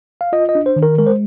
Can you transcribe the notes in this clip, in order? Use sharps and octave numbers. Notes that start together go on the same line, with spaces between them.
F5
F4 D#5
D#5
D4
C5
D#3
A#4
G#3 A#4
C5